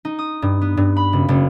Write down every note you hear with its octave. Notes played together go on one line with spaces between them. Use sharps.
D#4
D#6
G2
B3
G2
B5
F#1
F#1